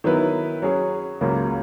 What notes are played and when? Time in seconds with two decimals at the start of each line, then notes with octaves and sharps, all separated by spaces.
0.04 D#3 F#3 B3 E4 B4
0.62 F#3 C#4 G#4 C#5
1.21 C#2 C#3 F#3 A#3